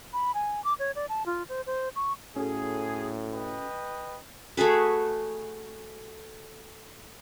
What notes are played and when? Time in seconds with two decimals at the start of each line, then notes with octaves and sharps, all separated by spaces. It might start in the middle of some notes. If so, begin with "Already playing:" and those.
0.13 B5
0.34 G#5
0.64 D6
0.79 C#5
0.96 D5
1.09 A5
1.26 F4
1.49 C5
1.67 C5
1.96 C#6
2.36 A2 C#4 F#4 G#4 A4
3.33 B4 D#5 G5
4.57 A3 F#4 G#4 B4